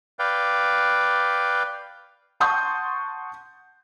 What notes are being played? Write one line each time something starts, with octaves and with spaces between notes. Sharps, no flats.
B4 D5 F5 G5
F#5 A5 C6 C#6 D#6 G6